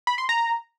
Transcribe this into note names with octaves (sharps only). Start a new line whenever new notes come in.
B5
C6
A#5